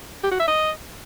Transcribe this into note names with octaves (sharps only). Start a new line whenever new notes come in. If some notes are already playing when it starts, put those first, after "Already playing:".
G4
F#4
E5
D#5